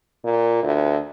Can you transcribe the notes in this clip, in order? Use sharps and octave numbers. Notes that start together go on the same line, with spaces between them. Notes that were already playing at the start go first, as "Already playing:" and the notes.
A#2
D2